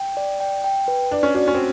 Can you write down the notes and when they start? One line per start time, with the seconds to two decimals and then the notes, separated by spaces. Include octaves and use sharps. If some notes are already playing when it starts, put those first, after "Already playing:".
Already playing: G5
0.17 D5
0.40 G5
0.64 G5
0.88 B4
1.11 D4 D5
1.23 C#4
1.35 D4 F#4
1.48 C#4
1.55 C4